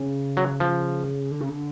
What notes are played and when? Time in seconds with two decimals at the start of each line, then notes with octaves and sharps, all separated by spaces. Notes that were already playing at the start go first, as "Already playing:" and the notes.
Already playing: C#3
0.37 F#3
0.60 F3
1.31 D3
1.40 C#3
1.49 D3